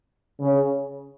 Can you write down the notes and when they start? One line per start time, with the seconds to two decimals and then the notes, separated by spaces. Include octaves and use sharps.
0.40 C#3